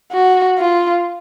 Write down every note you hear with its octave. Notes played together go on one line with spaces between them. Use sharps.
F#4
F4